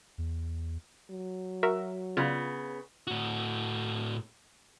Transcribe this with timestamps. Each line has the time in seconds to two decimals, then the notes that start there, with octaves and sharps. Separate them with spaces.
0.18 E2
1.11 F#3
1.63 F#4 A#4 E5
2.17 C#3 B3 F4
3.07 A2 F#4